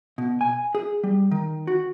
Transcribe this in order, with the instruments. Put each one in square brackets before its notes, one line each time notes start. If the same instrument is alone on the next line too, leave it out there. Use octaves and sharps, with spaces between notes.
[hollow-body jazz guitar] B2
G#5
G#4
G3
D#3
F#4